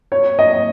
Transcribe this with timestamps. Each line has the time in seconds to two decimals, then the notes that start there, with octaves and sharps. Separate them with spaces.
0.12 C#5
0.39 D#5